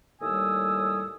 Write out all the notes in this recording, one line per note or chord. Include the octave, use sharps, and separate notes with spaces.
D#2 A2 G3 G#5 D#6 E6